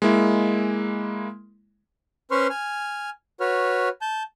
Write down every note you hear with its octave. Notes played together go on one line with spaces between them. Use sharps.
G#3 A#3 E4
C#4 B4 C5 C6 C#6 F6
G#5 F6
F#4 B4 C#5 F6
A5 G6